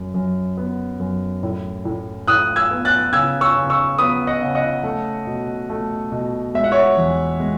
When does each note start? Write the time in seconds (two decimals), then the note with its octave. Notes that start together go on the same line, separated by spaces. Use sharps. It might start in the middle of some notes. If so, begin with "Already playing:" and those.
Already playing: F#2
0.14 F#2
0.57 B3
1.00 F#2
1.43 A2
1.85 A2
2.28 A2 D#6 F#6
2.56 E6 G#6
2.71 B3
2.85 F#6 A6
3.13 C#3 E6 G#6
3.41 C#6 E6
3.56 C#3
3.70 C#6 E6
3.99 B3 B5 D#6
4.27 D#5 F#5
4.41 C#3
4.55 D#5 F#5
4.83 A3
5.27 B2
5.70 A3
6.12 B2
6.54 G#3 E5
6.64 F#5
6.72 C#5 E5
6.97 E2
7.40 G#3